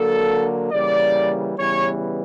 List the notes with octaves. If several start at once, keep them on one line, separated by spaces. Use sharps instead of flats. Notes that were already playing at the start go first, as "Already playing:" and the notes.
Already playing: D3 F#3 A#3 A4
C#3 E3 G3 A#3 D5
C#3 E3 G3 B3 C#5